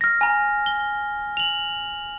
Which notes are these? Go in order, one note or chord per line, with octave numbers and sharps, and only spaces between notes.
F6 A#6
G#5 A#5
G7
F7 F#7